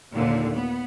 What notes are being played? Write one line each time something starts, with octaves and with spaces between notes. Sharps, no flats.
D#2 A#2 D3
B3